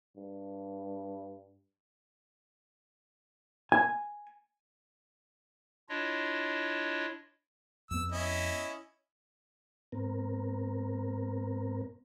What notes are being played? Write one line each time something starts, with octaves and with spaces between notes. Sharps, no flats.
G2
G#5
D4 E4 F4 C#5 D#5
F2 B3 E6
C#4 E4 D#5
G#2 B3 C4 A#4